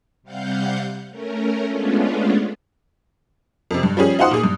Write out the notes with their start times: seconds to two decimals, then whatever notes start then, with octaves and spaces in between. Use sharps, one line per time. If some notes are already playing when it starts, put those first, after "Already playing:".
0.23 C3 G3 F5 F#5 G6
1.10 A3 C#4 A#4
1.67 G#3 A3 B3 C#4 D4 F4
3.71 F2 C3
3.83 G2
3.97 F3 G3 C#4 G#4
4.19 D#4 F4 C5 F#5 C6 D#6
4.31 A#2 G#4
4.44 G2